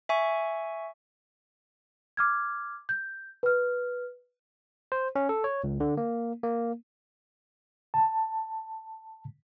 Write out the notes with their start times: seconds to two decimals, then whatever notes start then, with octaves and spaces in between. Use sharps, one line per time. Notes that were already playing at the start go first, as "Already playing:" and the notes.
0.09 E5 G#5 C#6
2.17 D6 F6 G#6
2.89 G6
3.43 B4 F6
4.92 C5
5.16 C#4
5.29 A4
5.44 C#5
5.64 C#2
5.80 D3
5.97 A#3
6.43 A#3
7.94 A5